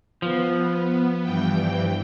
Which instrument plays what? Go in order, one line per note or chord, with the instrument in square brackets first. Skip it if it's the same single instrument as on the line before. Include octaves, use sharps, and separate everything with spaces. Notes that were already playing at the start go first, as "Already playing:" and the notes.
[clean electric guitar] F3 [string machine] B3
[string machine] G2 E3 G5